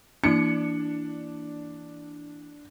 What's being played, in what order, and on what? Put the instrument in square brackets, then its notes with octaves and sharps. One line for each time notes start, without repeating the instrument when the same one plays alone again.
[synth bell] E3 A#3 E4 [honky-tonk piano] D4 C#7